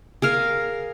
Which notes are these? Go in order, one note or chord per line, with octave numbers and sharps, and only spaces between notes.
G#4 A#4 F5